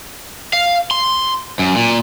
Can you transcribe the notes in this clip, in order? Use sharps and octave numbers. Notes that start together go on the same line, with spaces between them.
F5
C6
F#2
A#2